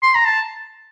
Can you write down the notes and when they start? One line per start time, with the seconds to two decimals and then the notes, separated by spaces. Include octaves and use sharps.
0.03 C6
0.15 A#5
0.27 A5